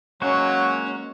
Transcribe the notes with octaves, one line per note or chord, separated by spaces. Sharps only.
F#3 G#3 A#3 C#4 F#4